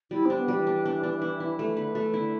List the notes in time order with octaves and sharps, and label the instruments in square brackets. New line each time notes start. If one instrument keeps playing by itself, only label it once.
[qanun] G3 [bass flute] E4
[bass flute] C4 [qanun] D4
[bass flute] B3
[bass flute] E3 [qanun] G3
[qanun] D4
D4
D4
E4
E4
A3
[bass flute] D3 [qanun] B4
[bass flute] E3 [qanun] A3
[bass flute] E3
[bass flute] D3 [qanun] E4